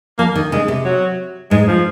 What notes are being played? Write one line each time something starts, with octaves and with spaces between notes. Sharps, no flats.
F3 A#3
D#3
C#3 G#3
C3
F#3
G#2 G#3
F3